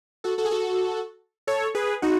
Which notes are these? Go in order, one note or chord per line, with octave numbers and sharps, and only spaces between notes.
F#4 A4
F#4 A4
G#4
F#4 A4
A4 C#5
G#4 B4
D#4 F#4